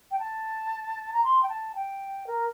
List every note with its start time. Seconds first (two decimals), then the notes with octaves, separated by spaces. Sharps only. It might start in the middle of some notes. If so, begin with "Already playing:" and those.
0.11 G5
0.19 A5
1.13 A#5
1.24 C6
1.43 G5
1.49 A5
1.75 G5
2.27 A#4